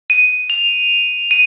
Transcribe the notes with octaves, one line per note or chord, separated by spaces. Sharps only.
D#7
F7
D#7